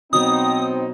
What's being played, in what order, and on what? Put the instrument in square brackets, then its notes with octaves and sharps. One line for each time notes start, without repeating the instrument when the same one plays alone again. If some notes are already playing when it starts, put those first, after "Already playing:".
[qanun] B2 F#3 B3 [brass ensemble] C4 D#4 [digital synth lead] D#6